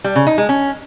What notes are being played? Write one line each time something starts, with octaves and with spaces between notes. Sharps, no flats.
G3
C#3
D#4
G#3
C#4